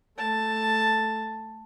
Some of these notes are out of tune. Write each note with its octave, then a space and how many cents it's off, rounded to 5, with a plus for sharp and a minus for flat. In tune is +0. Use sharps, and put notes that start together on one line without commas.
A3 +0 A5 +5